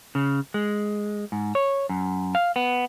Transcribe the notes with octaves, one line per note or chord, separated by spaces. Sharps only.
C#3
G#3
G#2
C#5
F#2
F5
B3